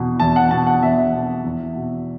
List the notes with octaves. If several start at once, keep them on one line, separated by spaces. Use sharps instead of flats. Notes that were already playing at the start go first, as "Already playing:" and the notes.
Already playing: E2 B2
E2 A5
F#5
B2 A5
F#5
E2 E5
B2
E2
B2